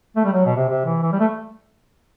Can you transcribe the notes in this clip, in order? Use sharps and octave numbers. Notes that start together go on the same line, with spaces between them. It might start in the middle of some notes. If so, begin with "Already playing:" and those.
A3
G3
F#3
B2
C3
C3
E3
E3
G3
A3